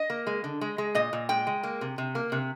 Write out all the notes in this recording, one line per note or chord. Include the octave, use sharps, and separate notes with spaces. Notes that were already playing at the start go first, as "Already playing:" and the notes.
Already playing: D#5
A#3
G#3
D3
G#3
G#3
A#2 D#5
A#2
G#3 G5
G#3
A#3
C3
C3
A#3
C3